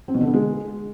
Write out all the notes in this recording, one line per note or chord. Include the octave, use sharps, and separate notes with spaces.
C4
B2
D3
B3
G#3